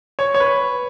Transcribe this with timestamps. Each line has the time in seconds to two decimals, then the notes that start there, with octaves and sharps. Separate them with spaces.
0.19 C#5
0.34 C#5
0.40 B4